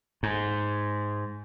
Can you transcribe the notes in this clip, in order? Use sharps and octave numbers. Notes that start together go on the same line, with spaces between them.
G#2